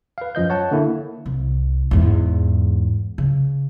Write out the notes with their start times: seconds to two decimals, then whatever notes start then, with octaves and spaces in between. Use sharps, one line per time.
0.18 B4 F5
0.35 F#2 F3 D#5 G6
0.50 C#5 F#5 A5
0.72 D3 A#3 E4
1.26 C2
1.91 E2 G#2
3.18 C#3